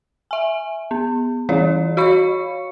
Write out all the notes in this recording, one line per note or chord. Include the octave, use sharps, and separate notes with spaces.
E5 G#5
B3
E3 G3 F4 G#4 C#5 D5
F#4 C#5 F5 B5 C#6 C#7